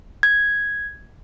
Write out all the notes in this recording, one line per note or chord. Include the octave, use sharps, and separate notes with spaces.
G#6